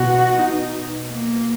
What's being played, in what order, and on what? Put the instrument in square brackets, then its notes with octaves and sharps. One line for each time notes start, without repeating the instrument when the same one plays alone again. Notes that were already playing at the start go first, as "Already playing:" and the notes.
Already playing: [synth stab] B2 [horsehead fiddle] F#4
[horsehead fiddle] D#4
A#3